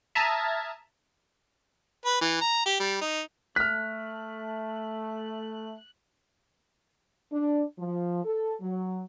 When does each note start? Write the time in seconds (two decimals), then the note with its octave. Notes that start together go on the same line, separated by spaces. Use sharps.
0.15 E5 A5 A#5 D#6 F6 G#6
2.06 B4
2.21 E3
2.41 A#5
2.66 G4
2.80 G3
3.01 D#4
3.56 A3 F6 F#6 B6
7.32 D4
7.79 F3
8.25 A4
8.62 F#3